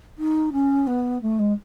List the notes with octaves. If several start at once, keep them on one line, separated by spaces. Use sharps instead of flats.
D#4
C#4
B3
A3
G#3